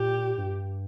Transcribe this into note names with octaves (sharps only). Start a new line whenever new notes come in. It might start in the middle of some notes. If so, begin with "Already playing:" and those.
Already playing: A#2 G4
G2